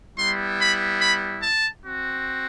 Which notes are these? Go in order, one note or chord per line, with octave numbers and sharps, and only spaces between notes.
G3 B3 E4 C6
B5
B5
A5
C4 F#4